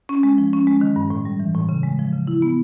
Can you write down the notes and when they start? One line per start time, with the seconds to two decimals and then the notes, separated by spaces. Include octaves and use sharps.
0.09 C#4
0.23 G#3
0.38 F3
0.53 C#4
0.67 G#3
0.81 D#3
0.96 G2
1.10 A2
1.25 G3
1.40 E3
1.55 A2
1.69 C#3
1.83 G#3
1.99 F3
2.13 C#3
2.27 E4
2.42 B3